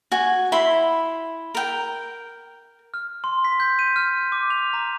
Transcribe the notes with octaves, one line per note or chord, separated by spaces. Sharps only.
F#4 G#5
E4 B5 C6
A#4 G5
F6
C6
B6
G6
D#7
F6
D6
F7
A#5